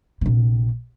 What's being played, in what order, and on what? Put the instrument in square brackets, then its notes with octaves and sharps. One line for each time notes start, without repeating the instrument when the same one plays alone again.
[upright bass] A#1 C3